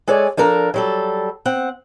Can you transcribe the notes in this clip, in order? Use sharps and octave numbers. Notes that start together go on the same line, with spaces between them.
G#3 A4 C#5 D5 G#5
F3 D4 A4 A#4
F#3 G3 A4
C4 F#5